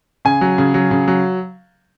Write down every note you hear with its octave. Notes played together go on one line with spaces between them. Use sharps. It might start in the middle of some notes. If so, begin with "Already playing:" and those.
C#3 G#5
F#3
C#3
F#3
C#3
F#3